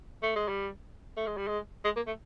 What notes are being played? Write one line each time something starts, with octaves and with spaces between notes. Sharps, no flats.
A3
G#3
G3
A3
G#3
G3
G#3
G#3
A#3
A3